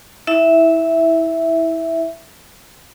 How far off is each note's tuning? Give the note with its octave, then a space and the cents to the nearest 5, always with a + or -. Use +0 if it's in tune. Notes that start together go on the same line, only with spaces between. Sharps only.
E4 -20 E5 +0